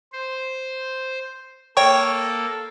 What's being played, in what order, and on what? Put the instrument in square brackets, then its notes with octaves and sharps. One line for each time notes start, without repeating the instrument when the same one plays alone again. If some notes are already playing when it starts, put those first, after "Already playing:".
[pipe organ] C5
[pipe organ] A#3 A4 [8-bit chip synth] C#5 G5 C#6